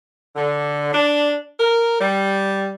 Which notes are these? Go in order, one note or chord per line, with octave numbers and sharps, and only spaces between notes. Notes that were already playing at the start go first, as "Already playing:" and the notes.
D3
D4
A#4
G3